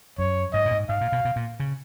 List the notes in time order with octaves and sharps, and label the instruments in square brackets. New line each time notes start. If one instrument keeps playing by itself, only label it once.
[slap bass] F#2 [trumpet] C#5
[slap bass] G#2 [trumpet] D#5
[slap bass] A#2
G#2
[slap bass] G#2 [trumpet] F5
[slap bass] A#2
B2
B2
A#2
C#3